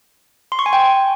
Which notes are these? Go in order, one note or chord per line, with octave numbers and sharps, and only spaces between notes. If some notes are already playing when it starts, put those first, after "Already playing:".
C6
C#6
G#5
G5